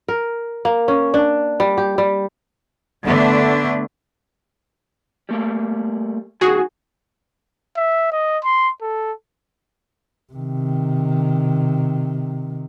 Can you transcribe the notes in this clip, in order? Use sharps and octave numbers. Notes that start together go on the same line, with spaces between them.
A#4
A#3
C#4
D4
G3
G4
G3
D3 A3 B3 D4
G3 A3 A#3
C2 D#3 F#4 G#4
E5
D#5
C6
A4
C3 D#3